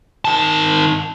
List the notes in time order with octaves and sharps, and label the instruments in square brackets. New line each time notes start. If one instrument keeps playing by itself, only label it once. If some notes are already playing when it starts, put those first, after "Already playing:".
[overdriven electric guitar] D#3 A5